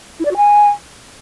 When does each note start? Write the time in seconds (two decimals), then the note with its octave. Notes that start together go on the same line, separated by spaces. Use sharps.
0.19 E4
0.25 D5
0.31 F#4
0.37 G#5